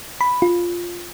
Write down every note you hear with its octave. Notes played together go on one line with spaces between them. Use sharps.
B5
F4